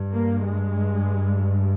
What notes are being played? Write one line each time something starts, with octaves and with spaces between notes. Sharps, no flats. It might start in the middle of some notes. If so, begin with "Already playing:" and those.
Already playing: G2
A#3
G#3